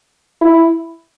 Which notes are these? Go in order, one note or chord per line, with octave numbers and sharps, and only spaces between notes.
E4